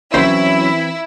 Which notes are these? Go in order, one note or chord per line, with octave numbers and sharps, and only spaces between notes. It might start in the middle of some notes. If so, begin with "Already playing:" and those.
A#1 D3 E3 F#3 C4 C#4 E4 C5